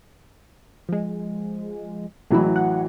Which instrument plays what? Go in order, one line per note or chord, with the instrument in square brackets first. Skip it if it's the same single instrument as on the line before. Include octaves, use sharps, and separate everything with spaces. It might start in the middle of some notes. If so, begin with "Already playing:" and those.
[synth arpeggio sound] F3 G#3
[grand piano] A1 E3 F#3 [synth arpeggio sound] G#3 E4
[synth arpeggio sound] F#5